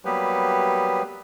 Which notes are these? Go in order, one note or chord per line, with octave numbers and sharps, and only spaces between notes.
F#3 G3 A#3 B3 G4 B4